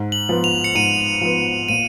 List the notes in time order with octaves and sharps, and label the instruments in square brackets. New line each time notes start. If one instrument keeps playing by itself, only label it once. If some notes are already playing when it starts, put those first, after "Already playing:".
Already playing: [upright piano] G#2
[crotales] F#7
[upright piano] F3 B3
[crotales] F7
C#7
[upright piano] G#2 [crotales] D#7
[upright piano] F3 B3
[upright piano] A#2 [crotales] D#7